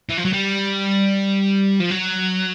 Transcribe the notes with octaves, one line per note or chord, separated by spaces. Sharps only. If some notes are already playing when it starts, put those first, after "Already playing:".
E3
F3
F#3
G3
F3
F#3